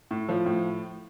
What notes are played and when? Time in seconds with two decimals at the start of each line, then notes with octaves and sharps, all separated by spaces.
0.11 A2
0.29 F3
0.46 A2